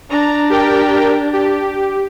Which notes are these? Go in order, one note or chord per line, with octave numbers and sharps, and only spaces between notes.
D4 A#5
G4 A#4 G5
G4